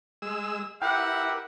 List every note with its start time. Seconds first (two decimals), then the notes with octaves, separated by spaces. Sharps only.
0.22 G#3 E6
0.82 E4 G4 A#4 B4 F#5 G5